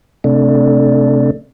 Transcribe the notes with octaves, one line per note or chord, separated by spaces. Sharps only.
C3 A3 D4